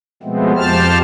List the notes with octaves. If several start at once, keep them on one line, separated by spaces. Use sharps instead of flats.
B2 F3 G#3 A3 B3 C4
F2 F3 G4 C5 A5 F6